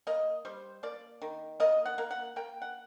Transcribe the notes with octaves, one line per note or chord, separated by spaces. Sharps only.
A#3 D#5
G3 C5
A#3 D5
D#3
A#3 D#5
F#5
A#3
F#5
A#3 G5
F#5